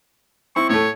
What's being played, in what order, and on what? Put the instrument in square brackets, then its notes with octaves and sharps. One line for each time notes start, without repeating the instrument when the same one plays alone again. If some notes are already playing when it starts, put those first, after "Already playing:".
[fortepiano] C4 E4 [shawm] C#6
[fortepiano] A2 A3 [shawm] C#5